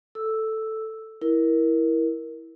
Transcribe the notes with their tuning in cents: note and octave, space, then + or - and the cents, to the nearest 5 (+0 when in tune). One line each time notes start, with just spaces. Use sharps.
A4 +0 E6 +0
E4 -5 A#4 +15